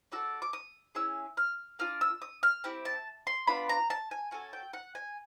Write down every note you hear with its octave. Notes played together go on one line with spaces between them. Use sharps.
D4 F#4 A4 E6
D6
D#6
C#4 E4 G#4 E6
F6
A#3 D4 F4 F6
E6
D#6
F6
C4 E4 G4
A5
C6
B3 D4 F4 B5
A#5
A5
G#5
C#4 F#4 A4 G#5
G5
F#5
G#5